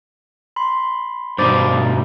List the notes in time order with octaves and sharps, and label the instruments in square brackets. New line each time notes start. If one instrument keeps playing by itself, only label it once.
[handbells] B5 C6
[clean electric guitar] G2 B2 D#3 [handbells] C5 D6 A6
[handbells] A3